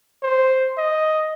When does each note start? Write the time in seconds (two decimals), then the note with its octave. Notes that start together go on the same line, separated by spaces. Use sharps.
0.23 C5
0.77 D#5